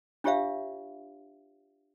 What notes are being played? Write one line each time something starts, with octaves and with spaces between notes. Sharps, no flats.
D4 F4 G4 C#5 E5 F5